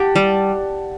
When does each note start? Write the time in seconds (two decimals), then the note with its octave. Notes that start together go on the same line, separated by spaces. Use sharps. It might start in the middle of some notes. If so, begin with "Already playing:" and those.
Already playing: G4 F#5 A5
0.16 G3